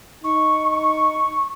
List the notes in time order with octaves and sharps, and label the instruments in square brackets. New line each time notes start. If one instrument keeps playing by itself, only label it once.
[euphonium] D#4 [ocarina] C#6